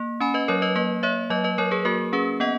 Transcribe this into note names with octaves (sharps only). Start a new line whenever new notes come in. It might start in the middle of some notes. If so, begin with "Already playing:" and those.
Already playing: A#3
C#4 G#5 B5
B4 D#5
F#3 A#4 C#5
B4 D#5
A#3 B4 D#5
A#3 C#5 E5
F#3 B4 D#5
B4 D#5
F#3 A#4 C#5
G#4 B4
A#3 F#4 A#4
C#4 G#4 B4
B3 D#5 F#5